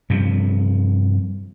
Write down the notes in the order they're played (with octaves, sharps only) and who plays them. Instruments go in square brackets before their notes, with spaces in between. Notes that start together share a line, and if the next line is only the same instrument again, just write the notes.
[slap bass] G2 C3 F3